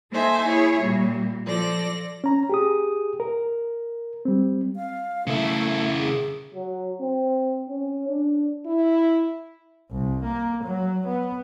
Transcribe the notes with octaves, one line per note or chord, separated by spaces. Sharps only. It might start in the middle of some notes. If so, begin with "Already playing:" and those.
A#3 D#4 A4 C5 E5 G#5
E4 G#4 C#5 E5
A#2 G3 A#3
F3 A4 D5 A#6
C#4 A#5
G4 G#4 D#6
A#4
G3 C4
F5
C#3 A3 E4
G#4
F#3
C4
C#4
D4
E4
C2
A#3
F#3
B3